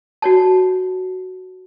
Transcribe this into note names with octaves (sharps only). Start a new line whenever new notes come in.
F#4 C#5 A5